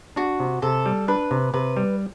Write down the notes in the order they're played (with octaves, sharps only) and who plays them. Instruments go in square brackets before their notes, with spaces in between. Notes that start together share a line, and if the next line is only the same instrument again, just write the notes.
[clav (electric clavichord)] D4 [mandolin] F#4
[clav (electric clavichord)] C3
[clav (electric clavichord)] C3 [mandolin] A4
[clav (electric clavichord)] G3
[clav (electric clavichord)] D4 [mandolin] B4
[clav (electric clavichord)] C3
[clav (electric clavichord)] C3 [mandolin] B4
[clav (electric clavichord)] G3